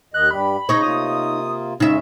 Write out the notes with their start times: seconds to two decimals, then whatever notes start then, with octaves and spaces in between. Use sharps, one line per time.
0.14 D#2 D#3 D#5 F#6
0.31 G2 G3 G4 B5
0.69 C#3 D#4 C#5 D#5
0.83 C3 A#3 F4 D#6
1.80 F2 C#3 G#3 C#4 D#4 E5